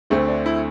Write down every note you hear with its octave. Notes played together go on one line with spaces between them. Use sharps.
D2 D3 A3 C4
D4
E4